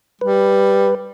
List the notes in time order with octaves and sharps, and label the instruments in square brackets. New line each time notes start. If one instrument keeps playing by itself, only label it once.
[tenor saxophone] G3 [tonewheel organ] B4